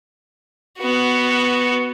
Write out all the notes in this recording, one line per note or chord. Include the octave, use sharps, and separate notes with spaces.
B3 F#4